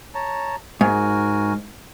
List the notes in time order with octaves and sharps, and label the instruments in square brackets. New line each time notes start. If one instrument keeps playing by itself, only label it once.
[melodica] C#5 A5 A#5
[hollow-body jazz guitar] G#2 [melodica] F#4 A#4 G#5